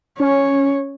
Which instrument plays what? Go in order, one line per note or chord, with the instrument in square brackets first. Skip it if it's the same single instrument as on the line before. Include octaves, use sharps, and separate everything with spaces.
[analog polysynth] C#4 [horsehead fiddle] C#5